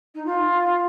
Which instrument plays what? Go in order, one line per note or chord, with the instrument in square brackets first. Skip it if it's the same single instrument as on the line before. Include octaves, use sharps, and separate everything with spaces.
[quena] D#4
F4